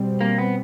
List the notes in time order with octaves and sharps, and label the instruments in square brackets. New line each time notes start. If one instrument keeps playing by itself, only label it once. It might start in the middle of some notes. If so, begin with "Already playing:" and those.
Already playing: [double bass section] B2 G3 C4
[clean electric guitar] A#3
B3